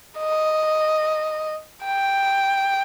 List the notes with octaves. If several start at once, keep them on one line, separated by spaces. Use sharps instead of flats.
D#5
G5